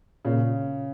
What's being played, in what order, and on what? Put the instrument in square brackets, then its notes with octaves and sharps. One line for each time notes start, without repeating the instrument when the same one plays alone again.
[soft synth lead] A#2 [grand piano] C#3